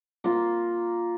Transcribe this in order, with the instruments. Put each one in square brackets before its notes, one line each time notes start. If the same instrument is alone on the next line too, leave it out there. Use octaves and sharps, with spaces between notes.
[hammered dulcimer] A#3 F4